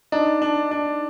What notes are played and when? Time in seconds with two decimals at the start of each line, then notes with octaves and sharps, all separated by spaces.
0.12 D4 D#4
0.42 D4
0.71 D4